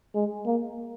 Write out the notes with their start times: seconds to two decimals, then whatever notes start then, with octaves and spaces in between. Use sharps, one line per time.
0.15 G#3
0.46 A#3